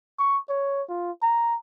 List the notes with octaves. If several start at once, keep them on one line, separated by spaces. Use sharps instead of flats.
C#6
C#5
F4
A#5